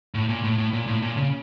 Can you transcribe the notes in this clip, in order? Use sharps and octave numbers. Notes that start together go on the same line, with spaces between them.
A2
A#2
A2
A2
A#2
A2
A#2
C#3